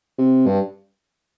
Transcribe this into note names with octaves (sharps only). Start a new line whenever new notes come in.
C3
G2